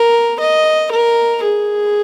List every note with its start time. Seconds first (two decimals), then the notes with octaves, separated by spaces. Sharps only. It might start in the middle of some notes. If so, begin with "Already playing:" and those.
Already playing: A#4
0.40 D#5
0.91 A#4
1.43 G#4